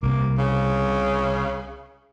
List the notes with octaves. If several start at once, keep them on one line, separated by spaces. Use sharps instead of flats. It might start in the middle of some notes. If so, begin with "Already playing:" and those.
C2 C3 A#3
C#3